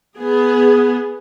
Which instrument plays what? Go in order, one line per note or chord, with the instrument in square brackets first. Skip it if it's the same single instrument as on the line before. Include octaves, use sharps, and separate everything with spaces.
[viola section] B3 G#4